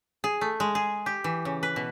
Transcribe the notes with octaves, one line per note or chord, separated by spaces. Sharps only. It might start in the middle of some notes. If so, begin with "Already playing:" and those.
G#4
A3
G#3
G#4
G4
E3
C#3
B4
B2